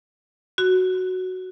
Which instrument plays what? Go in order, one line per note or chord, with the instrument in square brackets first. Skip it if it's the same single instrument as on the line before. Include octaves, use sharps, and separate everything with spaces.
[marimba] F#4